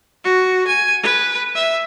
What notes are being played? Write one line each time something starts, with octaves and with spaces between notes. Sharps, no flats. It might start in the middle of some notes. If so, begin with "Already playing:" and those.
F#4
G#5
B4
E5